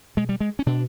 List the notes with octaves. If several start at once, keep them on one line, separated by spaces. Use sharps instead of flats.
B2 G#3
G3
G#3
C#4
B2 D4